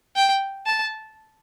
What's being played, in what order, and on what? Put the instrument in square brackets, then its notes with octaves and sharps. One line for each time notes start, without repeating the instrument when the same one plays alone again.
[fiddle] G5
A5